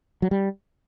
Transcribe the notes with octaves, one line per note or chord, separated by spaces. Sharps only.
F#3
G3